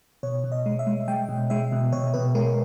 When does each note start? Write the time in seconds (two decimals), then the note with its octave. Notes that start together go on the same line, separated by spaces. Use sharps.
0.23 B2 C#5
0.44 B2
0.52 D#5
0.66 G#3
0.79 E5
0.87 G#3
1.08 G#3 G5
1.29 B2
1.50 G#3 E5
1.72 B2
1.92 B2 C#5
2.14 B2 B4
2.35 G#3 A#4